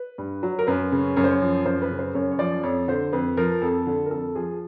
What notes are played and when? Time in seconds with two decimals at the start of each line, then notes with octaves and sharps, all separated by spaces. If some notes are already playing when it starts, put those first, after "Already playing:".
Already playing: B4
0.18 G2
0.43 F#3
0.59 A#4
0.67 F#2 B4
0.92 C#3
1.16 F#2 C#5
1.24 C5
1.31 C#5
1.41 F3
1.65 F#2 C5
1.82 B4
1.91 C#3
1.99 C5
2.15 F#2 C#5
2.32 C#5
2.39 F3 D5
2.63 F2 C#5
2.88 D3 C5
3.13 F2 B4
3.37 F3 A#4
3.62 F2 A4
3.87 D3
4.06 A#4
4.11 F2 A4
4.35 F3 G#4